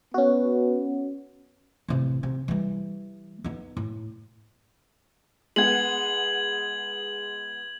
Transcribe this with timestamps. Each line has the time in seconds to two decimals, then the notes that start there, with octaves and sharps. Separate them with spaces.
0.14 B3 C#4 F#4
1.88 A1 C3
2.23 C3
2.48 E3 G3
3.44 B3 D#4
3.77 A2
5.56 G#3 B3 F#5 G#6 F#7